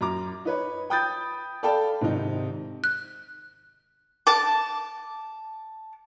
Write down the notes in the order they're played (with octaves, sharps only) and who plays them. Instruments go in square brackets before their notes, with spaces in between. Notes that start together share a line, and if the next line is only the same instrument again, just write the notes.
[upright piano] F#2 A#5 D6
D#4 B4 C#5
G5 B5 D#6 G6 A6
A4 D5 F5 G5 A5 B5
G#2 C3 D#3 D#4
[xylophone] F#6
[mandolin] A5 D6